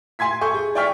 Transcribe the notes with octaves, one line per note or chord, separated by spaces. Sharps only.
G#5 C6 G#6 B6
A4 G#5 C#6 G6
G#4
D5 G5 G#5 C#6 F6 B6